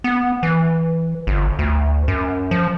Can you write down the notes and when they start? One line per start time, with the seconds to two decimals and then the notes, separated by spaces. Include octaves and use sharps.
0.04 B3
0.43 E3
1.27 G1
1.59 D2
2.08 F#2
2.51 F3